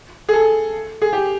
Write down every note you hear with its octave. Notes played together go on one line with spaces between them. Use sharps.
G#4
A4
G#4
G4